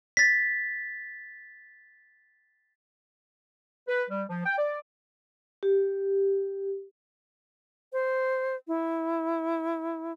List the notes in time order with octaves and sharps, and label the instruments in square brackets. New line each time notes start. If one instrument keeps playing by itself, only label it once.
[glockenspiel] A6 B6
[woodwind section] B4
G3
F3
G5
D5
[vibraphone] G4
[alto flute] C5
E4